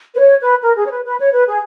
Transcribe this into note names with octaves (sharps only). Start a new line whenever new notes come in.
B4
C#5
B4
A#4
G#4
C#5
B4
B4
C#5
B4
G#4